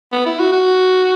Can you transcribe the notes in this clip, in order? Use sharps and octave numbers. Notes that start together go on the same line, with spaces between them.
B3
E4
F#4
F#4